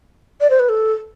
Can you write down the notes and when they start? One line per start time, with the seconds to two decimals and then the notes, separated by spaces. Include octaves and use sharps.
0.41 D5
0.50 C5
0.59 B4
0.69 A4